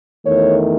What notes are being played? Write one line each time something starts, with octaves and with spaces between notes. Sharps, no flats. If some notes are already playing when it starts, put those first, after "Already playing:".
E2 D#3 A3 C#5